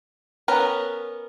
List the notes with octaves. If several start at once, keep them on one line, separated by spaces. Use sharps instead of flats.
B3 C#4 A#4 B4